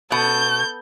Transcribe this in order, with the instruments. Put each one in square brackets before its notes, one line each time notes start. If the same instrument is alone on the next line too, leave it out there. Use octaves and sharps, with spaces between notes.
[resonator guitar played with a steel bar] B2 [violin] A4 G6